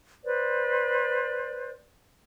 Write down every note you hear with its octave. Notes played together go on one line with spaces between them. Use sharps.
B4 C5 D5